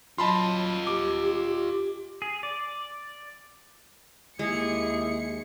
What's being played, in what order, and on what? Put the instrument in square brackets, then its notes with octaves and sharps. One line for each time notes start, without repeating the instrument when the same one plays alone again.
[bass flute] F#3 [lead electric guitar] F4 D#5 [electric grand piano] A5 B5 C6
[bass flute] G4 [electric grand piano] D6
[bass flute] G4
[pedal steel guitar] G#4
D5
[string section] D#2 C#7 [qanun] G#3 [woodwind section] E4 G4 G#4